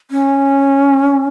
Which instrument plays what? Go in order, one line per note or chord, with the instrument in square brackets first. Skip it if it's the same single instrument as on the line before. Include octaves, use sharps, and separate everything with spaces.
[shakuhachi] C#4